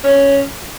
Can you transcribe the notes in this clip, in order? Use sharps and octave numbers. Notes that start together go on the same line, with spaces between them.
C#4